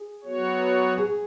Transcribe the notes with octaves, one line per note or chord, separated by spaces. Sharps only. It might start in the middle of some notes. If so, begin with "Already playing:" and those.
Already playing: G#4
F#3 B3 F#4 C#5
G#4